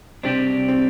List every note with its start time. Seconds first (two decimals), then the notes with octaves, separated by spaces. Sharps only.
0.23 C3 G3 C4 D4
0.68 C4